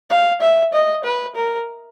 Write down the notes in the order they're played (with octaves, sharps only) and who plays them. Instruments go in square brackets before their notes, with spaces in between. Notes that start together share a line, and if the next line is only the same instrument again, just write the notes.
[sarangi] F5
E5
D#5
B4
A#4